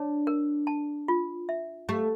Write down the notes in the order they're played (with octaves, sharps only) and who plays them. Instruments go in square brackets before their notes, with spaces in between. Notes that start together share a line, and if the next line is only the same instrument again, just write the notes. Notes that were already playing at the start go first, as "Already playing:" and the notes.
Already playing: [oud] D4 [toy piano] C#5
[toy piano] A#4
A5
F4
E5
[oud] A3 [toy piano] G4